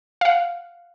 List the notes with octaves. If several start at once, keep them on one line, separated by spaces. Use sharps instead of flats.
F5 F#5